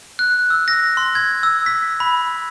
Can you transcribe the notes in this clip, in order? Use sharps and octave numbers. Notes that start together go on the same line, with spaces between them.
F#6
E6
A#6
C6
G#6
E6
B6
B5